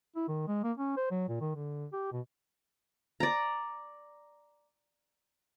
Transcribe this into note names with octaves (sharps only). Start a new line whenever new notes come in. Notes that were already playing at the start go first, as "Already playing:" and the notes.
E4
D#3
G#3
A#3
C#4
C5
F#3
A#2
D#3
D3
G4
B2
D5 A#5